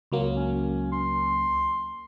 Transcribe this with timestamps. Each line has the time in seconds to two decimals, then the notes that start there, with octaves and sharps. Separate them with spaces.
0.12 C#2 F#3 A#3
0.35 C#4
0.92 C6